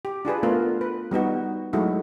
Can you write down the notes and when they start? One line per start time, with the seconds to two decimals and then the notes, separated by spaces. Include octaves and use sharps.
0.05 G4
0.25 D4 F4 G#4 B4
0.43 A3 B3 F4 A#4
0.81 B4
1.11 G3 B3 D#4 F#4
1.73 F#3 G#3 A3 D#4 E4 F#4